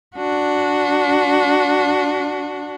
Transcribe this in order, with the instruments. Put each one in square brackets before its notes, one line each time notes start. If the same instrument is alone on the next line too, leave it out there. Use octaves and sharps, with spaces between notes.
[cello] D4 F#4